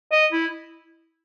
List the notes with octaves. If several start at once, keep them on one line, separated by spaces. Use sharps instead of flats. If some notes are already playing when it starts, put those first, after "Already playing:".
D#5
E4